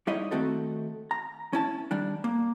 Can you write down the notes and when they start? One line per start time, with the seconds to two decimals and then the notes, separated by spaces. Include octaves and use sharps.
0.07 G3 D#4 E4 C#5 D#5
0.31 D#3 A3 C4 F#4 A4
1.11 A#5
1.53 C#4 E4 A5
1.91 D#3 G3 D4
2.24 A#3